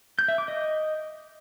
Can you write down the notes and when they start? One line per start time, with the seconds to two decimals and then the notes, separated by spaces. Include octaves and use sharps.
0.19 G6
0.28 E5
0.38 D6
0.48 D#5